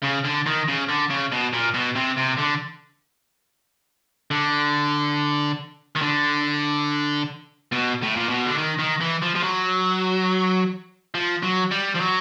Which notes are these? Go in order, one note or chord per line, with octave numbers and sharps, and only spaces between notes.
C#3
D3
D#3
C#3
D3
C#3
B2
A#2
B2
C3
C3
D3
D3
D#3
D3
B2
A2
A#2
B2
D3
D#3
D#3
E3
F3
F3
F#3
F3
F#3
G3
F3
F#3